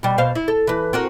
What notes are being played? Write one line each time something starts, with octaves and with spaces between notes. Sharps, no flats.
B2 G3
B2 C5 F5
E4
A4
E3 B4
C4 F#4 A#4